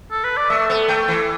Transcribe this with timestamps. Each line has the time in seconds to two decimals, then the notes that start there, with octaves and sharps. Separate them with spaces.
0.11 A4
0.24 B4
0.37 D5
0.50 A3 E5
0.70 B3
0.88 A3 G5
1.08 E3